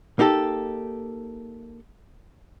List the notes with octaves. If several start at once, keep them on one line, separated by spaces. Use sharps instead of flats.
A#3 D#4 G4 A4